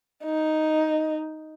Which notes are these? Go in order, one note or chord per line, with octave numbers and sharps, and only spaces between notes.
D#4